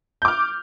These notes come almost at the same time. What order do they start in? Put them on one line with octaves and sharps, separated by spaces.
G6 D6 F6